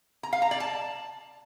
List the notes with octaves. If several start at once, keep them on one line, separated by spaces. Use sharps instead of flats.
A#5
F5
A#5
D5
A5